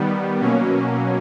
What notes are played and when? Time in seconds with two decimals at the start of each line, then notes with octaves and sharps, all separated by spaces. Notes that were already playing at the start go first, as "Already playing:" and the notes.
Already playing: D#3 G3 B3
0.40 B2 F#3 A#3 C#4